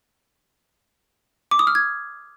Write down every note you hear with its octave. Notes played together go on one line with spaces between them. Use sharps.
D6
D#6
F6
G#6